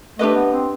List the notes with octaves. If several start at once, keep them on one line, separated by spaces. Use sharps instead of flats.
A3 D4 G4 B4 D#5
B3
C4